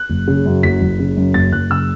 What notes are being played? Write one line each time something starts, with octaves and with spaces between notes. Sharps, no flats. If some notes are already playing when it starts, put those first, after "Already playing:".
Already playing: F#6
F#1
C#3
F#2
F#1 B6
F#1
C#3
F#2
F#1 A6
F#1 F#6
C#3 E6